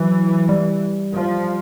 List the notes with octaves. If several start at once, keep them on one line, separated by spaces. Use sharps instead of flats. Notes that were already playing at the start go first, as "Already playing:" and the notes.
Already playing: E3 F#3
G3
F3